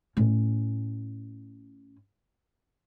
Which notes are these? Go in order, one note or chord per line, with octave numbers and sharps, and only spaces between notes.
A2 C#4